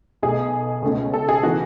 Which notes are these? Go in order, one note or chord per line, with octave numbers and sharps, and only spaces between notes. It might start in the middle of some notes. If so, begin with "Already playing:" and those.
B1 B2 A3 G#4
C#2 B2 A3 C#4
A4
G#4
C#3 E3 B3 F#4